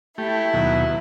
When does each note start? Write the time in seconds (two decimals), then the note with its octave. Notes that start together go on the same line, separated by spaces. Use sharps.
0.18 A3 E4 G4
0.54 D#2 B2 F#3